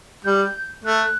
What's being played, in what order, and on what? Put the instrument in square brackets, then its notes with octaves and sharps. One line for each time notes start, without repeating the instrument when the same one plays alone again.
[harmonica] G3 [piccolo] G6
[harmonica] A3 [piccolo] F#6